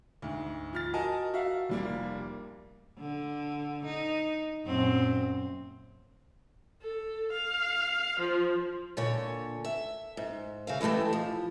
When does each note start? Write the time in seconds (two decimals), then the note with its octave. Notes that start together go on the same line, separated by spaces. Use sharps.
0.22 D2 G#2
0.73 F3 F6 A6
0.93 F#4 A#4 D#5 G#5 A5
1.34 F#4 E5 F5
1.69 F1 G3 A#3
2.99 D3
3.85 D#4
4.66 F#2 A#2 C4
6.82 A4
7.32 F5
8.19 F3
8.97 A#2 D3 C#5
9.65 E5
10.17 G#2
10.67 C#3 E5 F5
10.81 E3 G#3 A3 G4 A4
11.13 F3